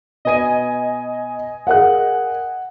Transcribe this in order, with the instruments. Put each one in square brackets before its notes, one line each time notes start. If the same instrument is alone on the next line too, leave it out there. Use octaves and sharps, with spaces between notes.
[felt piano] B2 B4 D#7 [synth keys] D#5 G#5
[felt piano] G#4 A#4 F5 [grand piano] F#5 F#6